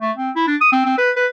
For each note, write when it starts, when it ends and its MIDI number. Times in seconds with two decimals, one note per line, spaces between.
0.01 0.11 57
0.17 0.31 60
0.36 0.43 64
0.47 0.56 62
0.61 0.70 87
0.72 0.81 60
0.86 0.96 60
0.98 1.11 71
1.17 1.26 71